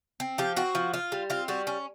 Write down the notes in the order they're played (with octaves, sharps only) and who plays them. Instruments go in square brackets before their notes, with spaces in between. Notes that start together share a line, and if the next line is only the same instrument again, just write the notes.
[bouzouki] C4
F3 G4
C4 F#4
F3
F4
G3
C4 F4
G3 F#4
C#4